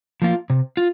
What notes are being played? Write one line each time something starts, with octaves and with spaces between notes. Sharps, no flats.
F3 A#3 F4
C3
F4